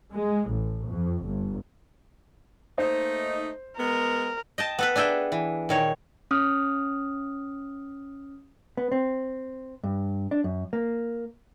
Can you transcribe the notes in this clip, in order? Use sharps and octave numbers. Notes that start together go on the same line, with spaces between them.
G#3
A1
F2
G1
A3 A#3 D#4 C5
G#3 B3 A#4
D#5 G5 A5
B3 A4 B4
D4 G#4 A4 E5 G5
E3
A#2 D#3 C#5
C#4 D#6 F6
B3
C4
G2
D4
F#2
A#3